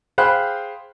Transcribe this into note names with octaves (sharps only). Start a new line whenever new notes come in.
G#4 C5 F5 G5 B5 F#6